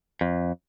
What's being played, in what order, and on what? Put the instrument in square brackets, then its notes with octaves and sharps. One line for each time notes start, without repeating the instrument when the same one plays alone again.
[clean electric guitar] F2